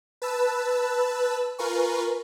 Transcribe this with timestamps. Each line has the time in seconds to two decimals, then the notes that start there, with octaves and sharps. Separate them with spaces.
0.22 B4 A5 E6
1.58 F4 A#4 B4 G#5 C#6